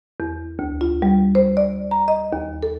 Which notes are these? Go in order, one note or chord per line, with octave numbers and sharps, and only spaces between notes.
E2
D2
F4
G3
C5
D5
A#5
D#5
D#2
A4